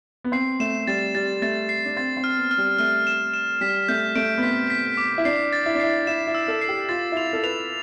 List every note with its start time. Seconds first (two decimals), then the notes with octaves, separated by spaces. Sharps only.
0.24 B3
0.32 C4 C7
0.60 A3 E7
0.87 G3 A6
1.15 G3 A6
1.42 A3 A6
1.69 C7
1.86 D4
1.96 C4 A6
2.17 C4
2.24 F6
2.38 B3
2.51 F6
2.58 G3
2.78 A3 F6
3.07 E7
3.34 E7
3.61 G3 B6
3.88 A3 G6
4.15 A3 D7
4.38 B3
4.43 C4 B6
4.70 B6
4.97 D6
5.18 E4
5.25 D4 C7
5.53 A6
5.66 E4
5.75 D4
5.80 E4 C7
6.07 E4 E7
6.27 E4
6.35 E6
6.48 A4
6.61 C7
6.69 G4
6.89 F4 A6
7.12 E4
7.17 F4 F7
7.33 A4
7.43 B4 F7